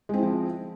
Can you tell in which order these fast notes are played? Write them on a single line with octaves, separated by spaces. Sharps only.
G#3 C4 E4 F3